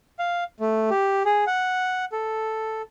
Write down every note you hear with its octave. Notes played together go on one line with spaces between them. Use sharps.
F5
A3
G4
G#4
F#5
A4